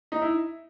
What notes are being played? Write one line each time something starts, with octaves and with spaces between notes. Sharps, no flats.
D#4
E4